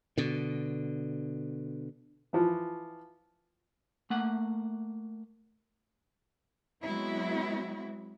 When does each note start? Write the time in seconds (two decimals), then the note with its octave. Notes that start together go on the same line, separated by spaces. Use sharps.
0.18 B2 D3
2.33 E3 F3
4.10 A3 A#3 F#5
6.84 F#3 G#3 B3 C4 E4 F#4